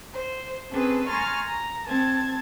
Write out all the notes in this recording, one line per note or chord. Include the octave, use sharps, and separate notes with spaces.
C5
C4 C#4 G#4 A4 B4
G#5 A#5 C6 C#6 F6 A6
A#5
C4 A5 G#6 A6